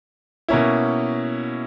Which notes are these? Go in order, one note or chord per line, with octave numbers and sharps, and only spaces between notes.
B2 A#3 C#4 E4